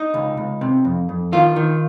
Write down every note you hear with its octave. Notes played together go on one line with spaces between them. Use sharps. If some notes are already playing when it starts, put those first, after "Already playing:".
Already playing: D#4
C#2
C#2
C3
F2
F2
D#3 F4
D#3